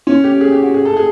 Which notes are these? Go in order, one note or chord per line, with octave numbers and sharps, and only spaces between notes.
C#4
G4
G#4
G4
F#4
G#4
A4
G#4